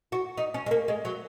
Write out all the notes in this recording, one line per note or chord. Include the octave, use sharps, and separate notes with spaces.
F#4
D#4
C#4
G#3
A#3
G#3
F#3